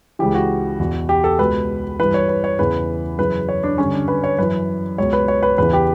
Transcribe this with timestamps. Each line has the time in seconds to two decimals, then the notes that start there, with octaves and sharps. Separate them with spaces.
0.19 C#2 C#3 E3 G4
0.35 F#4
0.79 E2 B2
1.09 G4
1.24 A4
1.39 C#2 B2 B4
1.99 G2 E3 B4
2.14 C#5
2.29 B4
2.44 C#5
2.59 E2 C#3 E3 B4
3.19 F#2 C#3 E3 B4
3.49 C#5
3.64 D4
3.78 G2 D3 C#4
3.93 D4
4.08 B4
4.24 C#5
4.38 F#2 E3 B4
4.98 C#2 B2 C#5
5.13 B4
5.28 C#5
5.43 B4
5.58 E2 C#3 E3 B4
5.73 G4